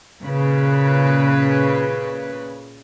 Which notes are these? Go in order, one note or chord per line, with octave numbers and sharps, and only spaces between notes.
A#2 C#3 B4